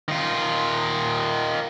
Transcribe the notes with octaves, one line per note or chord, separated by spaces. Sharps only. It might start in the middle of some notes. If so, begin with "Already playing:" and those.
D#3 F4